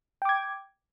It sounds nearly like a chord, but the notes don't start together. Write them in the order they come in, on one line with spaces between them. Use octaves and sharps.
G5 D6 G#6